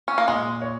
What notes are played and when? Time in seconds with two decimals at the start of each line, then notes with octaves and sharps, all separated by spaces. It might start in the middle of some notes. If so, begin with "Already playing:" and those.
0.08 C#4
0.18 A#3
0.28 A#2 G#3
0.62 C#5